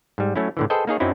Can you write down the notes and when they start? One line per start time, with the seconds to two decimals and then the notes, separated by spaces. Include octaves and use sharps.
0.18 G#2 G3
0.36 F#3 A3 C#4 E4
0.57 A2 D3 E3
0.70 G#4 A4 B4 C5 D#5 G5
0.87 A#3 D#4 G#4 C#5
1.00 F#2 F#3 C4 D#4 E4